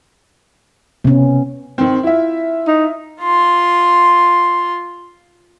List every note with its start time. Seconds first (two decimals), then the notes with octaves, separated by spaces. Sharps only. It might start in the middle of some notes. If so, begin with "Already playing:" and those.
1.05 C3 B3 C#4
1.78 D#3 C4
2.03 E4 F4 E5
2.67 D#4
3.21 F4 C6